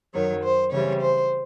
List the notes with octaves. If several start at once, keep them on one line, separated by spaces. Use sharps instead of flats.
F#2 D#3 F#3 C#5
C5
C#3 E3 G3 C4 C#5
C5